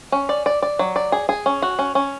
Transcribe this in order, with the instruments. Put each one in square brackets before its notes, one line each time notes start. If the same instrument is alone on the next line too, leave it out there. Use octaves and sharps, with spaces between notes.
[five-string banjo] C#4
D5
D5
D5
F#3
D5
G#4
G#4
C#4
F#4
C#4
C#4